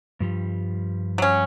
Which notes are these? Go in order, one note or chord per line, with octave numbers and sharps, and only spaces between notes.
G2 F3 G3
F#3 C#4